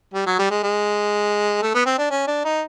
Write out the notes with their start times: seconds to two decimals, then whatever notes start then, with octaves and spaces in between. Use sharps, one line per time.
0.14 G3
0.27 F#3
0.39 G3
0.50 G#3
0.63 G#3
1.62 A3
1.75 B3
1.86 C4
1.98 D4
2.10 C#4
2.27 D4
2.44 D#4